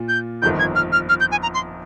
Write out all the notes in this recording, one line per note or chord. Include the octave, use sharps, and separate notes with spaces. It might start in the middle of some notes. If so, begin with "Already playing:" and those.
Already playing: A#2 F4
G6
G1 F2 D#3 G6
G#6
F6
F6
F6
G6
G#5
A#5
C6